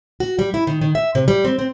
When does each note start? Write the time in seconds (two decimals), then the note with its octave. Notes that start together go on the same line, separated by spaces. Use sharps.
0.20 F#4
0.39 G3
0.54 E4
0.67 D#3
0.81 D#3
0.95 E5
1.15 C3
1.28 G3
1.45 C4
1.59 C4